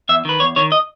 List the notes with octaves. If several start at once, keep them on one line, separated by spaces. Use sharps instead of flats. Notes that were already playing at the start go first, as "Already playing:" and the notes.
E2 E5
D#3 B4
E2 C#5
D#3 C#5
D#5